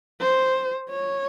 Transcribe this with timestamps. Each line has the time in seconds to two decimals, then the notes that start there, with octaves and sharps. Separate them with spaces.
0.21 C5
0.90 C#5